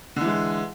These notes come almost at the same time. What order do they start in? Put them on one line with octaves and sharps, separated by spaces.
D3 E3 G#3